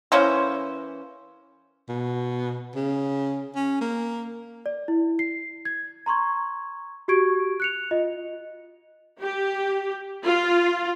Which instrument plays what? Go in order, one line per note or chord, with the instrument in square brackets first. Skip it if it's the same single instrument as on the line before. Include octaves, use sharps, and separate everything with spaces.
[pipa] E3 A#3 C#4 C5
[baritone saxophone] B2
C#3
C#4
A#3
[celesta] D5
E4
C7
G#6
A#5 C6 C#6 G#6
F#4 G4 C#6 G#6 D7
F#6 C#7 F7
F4 D#5
[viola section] G4
F4